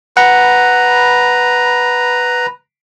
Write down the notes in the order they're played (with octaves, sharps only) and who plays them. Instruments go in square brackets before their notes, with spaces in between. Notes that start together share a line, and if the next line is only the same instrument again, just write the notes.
[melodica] B4 A#5 [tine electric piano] F#5